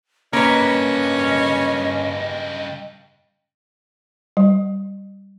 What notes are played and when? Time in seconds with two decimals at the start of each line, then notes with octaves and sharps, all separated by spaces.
0.33 G2 C#3 A#3 C#4 B4 D#5
4.37 G3